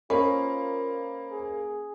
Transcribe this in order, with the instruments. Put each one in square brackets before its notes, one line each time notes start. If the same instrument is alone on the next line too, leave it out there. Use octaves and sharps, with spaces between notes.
[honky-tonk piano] A#3 [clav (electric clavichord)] C#4 [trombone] F4 [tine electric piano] C5 D#5 B5
[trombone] G#4